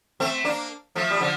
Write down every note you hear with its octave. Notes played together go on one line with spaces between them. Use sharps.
A3 C4
A#3 D4
F3 A3
G3
D3 F3